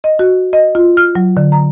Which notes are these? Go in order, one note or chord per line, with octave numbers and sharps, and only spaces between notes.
D#5
F#4
D#5
F4
F6
F#3
D3
A#5